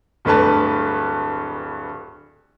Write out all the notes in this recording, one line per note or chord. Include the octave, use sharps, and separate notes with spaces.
D1 G2 A3 B4 A5